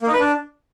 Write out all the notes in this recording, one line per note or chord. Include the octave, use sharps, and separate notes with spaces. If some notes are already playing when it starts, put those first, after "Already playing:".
A#3
D#4
B4
D4